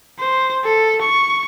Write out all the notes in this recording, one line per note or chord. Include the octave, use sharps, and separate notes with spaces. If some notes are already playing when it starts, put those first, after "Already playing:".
C5
A4
C#6